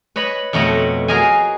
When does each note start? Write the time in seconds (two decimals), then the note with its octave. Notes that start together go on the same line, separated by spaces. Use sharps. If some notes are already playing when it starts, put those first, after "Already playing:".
0.16 B4 C#5 D#5 B5
0.53 F2 B2 A3 C#5 D#5 F#5
1.08 F#4 G#4 A#4 D#5 F5 G#5